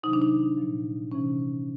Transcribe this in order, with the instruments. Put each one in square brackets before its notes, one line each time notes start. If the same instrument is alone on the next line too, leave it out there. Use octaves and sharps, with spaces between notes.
[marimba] C3 D#3 F#3 D#4
D4
D#4
A#2 F3
C3 E3 C#4